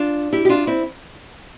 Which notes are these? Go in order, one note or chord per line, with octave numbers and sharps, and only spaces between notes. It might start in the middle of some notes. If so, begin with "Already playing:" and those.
Already playing: D4 F4
E4 G4
G4
D4 F4
C4 E4